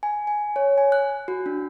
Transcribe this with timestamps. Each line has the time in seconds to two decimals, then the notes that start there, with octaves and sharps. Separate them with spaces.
0.03 G#5
0.27 G#5
0.56 C#5
0.78 G#5
0.92 F#6
1.28 F#4
1.46 D4